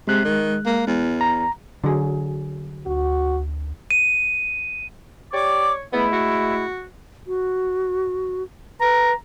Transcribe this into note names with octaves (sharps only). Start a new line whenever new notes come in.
C3 G#3 F#6
D#3
A#3
E2
A#5
D3 F#3 G#4
D2 F#4
D#7
G4 C#5 D5 D6
G#3 A3 B3 E4
F#4
F#4
B4 A#5